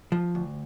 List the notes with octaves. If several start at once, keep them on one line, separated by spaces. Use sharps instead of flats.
F3
D2